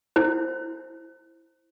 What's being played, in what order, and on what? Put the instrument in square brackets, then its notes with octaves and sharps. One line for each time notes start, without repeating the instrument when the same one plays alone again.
[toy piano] E4 C5